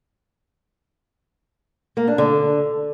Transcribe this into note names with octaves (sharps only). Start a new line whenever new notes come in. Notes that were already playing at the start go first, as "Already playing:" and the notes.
A#3
D4
D3